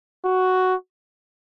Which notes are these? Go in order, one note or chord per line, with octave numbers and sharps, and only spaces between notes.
F#4